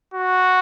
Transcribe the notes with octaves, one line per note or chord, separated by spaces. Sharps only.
F#4